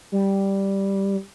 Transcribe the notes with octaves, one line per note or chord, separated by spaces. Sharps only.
G3